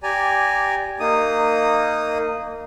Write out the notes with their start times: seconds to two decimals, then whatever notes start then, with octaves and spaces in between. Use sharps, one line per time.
0.03 G4 D5 G#5 A#5
1.00 A#3 D#4 D#6